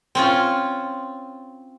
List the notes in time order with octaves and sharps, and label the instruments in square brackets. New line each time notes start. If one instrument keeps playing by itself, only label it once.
[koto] C4 C#4 F4